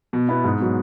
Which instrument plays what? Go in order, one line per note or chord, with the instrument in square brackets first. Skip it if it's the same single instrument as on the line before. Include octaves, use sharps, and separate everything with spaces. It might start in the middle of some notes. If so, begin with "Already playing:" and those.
[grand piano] B2
B3 E4
G#2
F#3 B3